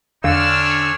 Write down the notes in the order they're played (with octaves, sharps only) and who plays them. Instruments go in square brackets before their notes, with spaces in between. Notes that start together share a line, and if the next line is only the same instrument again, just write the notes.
[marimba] E2 [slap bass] D3 [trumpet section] C#4 D4 C#5 [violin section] E6 F6